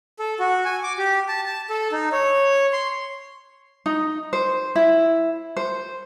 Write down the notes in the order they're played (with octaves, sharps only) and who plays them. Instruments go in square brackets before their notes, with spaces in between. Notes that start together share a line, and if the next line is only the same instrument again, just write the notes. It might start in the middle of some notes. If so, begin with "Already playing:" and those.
[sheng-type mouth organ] A4
F#4
G#5
D6
G4
A5
A5
A4
D#4
C#5
C6
[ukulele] D#4
C5
E4
C5